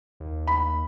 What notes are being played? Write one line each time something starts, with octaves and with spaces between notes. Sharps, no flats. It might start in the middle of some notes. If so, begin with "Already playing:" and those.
D#2
B5